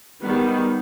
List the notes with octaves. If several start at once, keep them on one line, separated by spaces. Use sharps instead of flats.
D#3 G3 B3